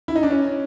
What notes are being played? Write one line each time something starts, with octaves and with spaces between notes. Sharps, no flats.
E4
D#4
D4
C#4